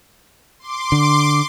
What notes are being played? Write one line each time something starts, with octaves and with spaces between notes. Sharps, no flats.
C6 D6
D3